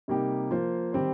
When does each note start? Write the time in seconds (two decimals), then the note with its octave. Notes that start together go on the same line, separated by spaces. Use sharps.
0.08 C3 G3 A#3 D#4 G4
0.51 F3 A#3 F4 C5
0.93 D#3 G3 C4 G4 C5